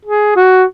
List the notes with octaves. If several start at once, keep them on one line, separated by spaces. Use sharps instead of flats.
G#4
F#4